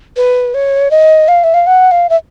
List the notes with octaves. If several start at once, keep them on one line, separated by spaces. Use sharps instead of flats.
B4
C#5
D#5
F5
E5
F5
F#5
F5
E5